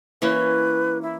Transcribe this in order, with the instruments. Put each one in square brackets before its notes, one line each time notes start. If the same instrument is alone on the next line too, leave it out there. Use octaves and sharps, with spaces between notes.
[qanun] E3 A#3 C#4 [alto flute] B4
[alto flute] E4